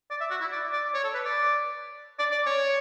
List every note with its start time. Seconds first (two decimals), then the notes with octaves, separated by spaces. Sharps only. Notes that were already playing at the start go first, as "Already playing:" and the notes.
0.11 D5
0.20 E5
0.31 F#4
0.41 E4
0.52 D5
0.73 D5
0.94 C#5
1.04 A4
1.14 B4
1.25 D5
2.19 D5
2.32 D5
2.46 C#5